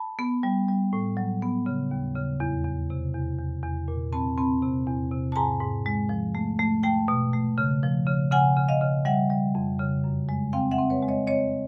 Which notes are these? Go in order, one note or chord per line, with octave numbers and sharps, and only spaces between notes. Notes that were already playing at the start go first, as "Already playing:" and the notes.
Already playing: A5 B5
B3
G3
G3
A2
F#3
B3
C#3
D#2
C#3
E2
E2
C3
E2
E2
E2
A#2
C4 A5 B5
C4 A5 B5
C3
E2
C3
A5
G#2 G#5 A#5
G#2
G#3
F3
A3
A3
A3 G5 A5
B2
A3
C#3
F3
C#3
C#3 F#5 G#5
C#3
D#5 F5
C#3
G3 E5 F#5
G3
F2
C#3
F#2
G#3
C4 F5 G5
E5 F#5
C4
B4 C#5
G#3
C#5 D#5
C4 C#5 D#5